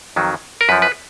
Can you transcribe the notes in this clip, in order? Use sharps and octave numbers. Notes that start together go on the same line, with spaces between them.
F2 D#3 F#3
A#4
F#2 F3 B4
B4